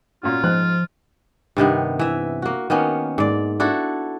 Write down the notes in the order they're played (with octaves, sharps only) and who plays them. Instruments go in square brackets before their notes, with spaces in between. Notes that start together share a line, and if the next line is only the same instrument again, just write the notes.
[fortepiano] A#2 C#4 F#4 [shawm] F4
[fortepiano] G#2 F#6 [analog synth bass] F3
[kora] G2 C3 D#3 B3
E3 E5
A#3 F#4
D#3 A#3 B3 C#4
G#2 D5
D4 E4 F#4 A4